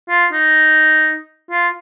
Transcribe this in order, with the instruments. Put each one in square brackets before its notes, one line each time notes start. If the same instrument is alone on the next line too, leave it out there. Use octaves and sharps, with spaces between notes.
[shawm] F4
D#4
F4